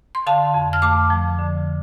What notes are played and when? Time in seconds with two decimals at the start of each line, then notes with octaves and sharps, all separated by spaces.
0.15 C6
0.26 D3 F5 A5
0.54 F2
0.73 F6
0.82 A3 A5 D6
1.10 F3
1.39 D3